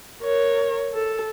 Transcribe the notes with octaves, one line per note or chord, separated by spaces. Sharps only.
A#4 C#5
A4